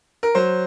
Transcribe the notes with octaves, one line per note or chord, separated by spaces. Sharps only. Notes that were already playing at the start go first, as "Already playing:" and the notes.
A#4
F#3 C5